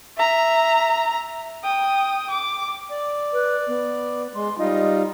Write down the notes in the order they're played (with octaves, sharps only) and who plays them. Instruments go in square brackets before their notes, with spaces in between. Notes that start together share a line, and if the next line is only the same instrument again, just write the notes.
[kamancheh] E5 A#5
G5 D#6
D6
[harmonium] D5
[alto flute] B4
B3
[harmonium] G#3 [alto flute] C6
[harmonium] G3 D#4 F4 [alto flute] D#5